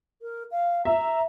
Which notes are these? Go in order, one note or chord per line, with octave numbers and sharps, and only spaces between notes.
A#4
F5
E5 A#5